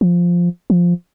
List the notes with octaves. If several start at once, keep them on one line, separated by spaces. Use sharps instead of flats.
F3
F3